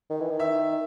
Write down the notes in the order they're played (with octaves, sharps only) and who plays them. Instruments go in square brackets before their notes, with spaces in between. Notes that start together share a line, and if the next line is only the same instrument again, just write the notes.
[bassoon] D#3
E3
D#3
[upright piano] E5